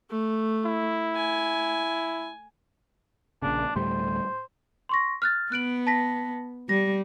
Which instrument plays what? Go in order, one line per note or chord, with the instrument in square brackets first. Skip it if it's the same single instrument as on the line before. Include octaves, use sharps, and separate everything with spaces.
[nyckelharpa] A3
[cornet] E4
[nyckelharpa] G#5
[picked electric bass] A#1 A#2 C#3 [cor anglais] D4
[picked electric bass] D2 A2 G3 [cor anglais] C5
[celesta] C6 C#6 A#6
F6 F#6 A6
[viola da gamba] B3 [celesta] F#6 D7 F#7
[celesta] A5 A#6 B6
[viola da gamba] G3 [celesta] A#6